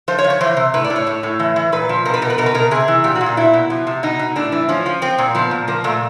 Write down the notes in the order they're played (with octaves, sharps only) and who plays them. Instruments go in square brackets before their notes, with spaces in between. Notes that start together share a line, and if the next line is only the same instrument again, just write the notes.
[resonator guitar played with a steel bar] F3 C5
C#5
F3
C#5
E3 C5
C3
A2 B4
D5
A2
C#5
A2
A2
E3
E3
A#2 B4
F3
B2 A#4
B4
B2 A#4
B4
B2 A#4
B4
B2 A#4
C3 G#4
E3
A#2 G4
F#4
A#2
F4
B2 E4
B2
F3
C3
B2 D#4
B2
A2 D4
E3
F3 C#4
F3
F3 C4
A#2
F3 B3
A#2
F3 A#3
A#2 A3